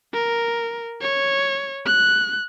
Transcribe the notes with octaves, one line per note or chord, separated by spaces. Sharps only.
A#4
C#5
F#6